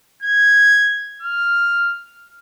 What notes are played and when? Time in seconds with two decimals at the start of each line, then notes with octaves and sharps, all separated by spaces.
0.22 G#6
1.22 F6